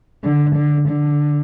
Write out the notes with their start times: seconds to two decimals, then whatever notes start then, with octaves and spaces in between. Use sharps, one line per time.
0.24 D3
0.55 D3
0.88 D3